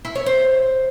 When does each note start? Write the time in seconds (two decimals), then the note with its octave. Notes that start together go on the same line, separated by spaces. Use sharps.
0.05 E4
0.16 C#5
0.26 C5